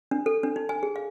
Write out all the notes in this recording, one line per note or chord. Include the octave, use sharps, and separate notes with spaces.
D4
A4
D4
D#4
G#5
G#4
F5